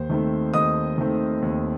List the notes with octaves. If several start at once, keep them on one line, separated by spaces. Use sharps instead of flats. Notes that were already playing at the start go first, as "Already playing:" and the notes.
Already playing: D#2 C5
D#3 A3 C4
D#2 D#5 D#6
D#3 A3 C4
D#2